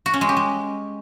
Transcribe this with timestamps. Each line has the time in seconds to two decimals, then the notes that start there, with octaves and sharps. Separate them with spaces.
0.06 F#4
0.13 C#4
0.21 G#3
0.29 G4
0.37 G#3